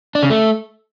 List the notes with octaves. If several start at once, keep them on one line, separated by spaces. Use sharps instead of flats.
D4
C#3
A3